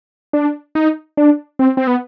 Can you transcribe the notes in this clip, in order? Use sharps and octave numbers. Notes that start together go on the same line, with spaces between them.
D4
D#4
D4
C4
C4
B3